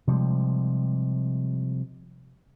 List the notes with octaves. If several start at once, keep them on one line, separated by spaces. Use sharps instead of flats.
C3 F3 G3 G#3